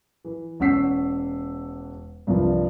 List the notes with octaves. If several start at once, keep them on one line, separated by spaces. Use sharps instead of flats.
E3
E1 C#4 F#5 E6 B6 C7
C2 G2 F3